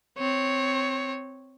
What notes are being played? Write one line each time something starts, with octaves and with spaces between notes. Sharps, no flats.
C4 C#5